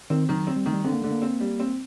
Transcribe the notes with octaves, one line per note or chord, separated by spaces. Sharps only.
D#3 C4
D#3 F#3
C4
G3
D#3 A3
G3
D3 C4
A#3
D3 A3
A#3
C4
G3
C4